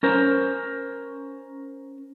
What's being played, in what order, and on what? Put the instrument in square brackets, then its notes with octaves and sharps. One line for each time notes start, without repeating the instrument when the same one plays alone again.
[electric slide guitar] C#4 A#4 C5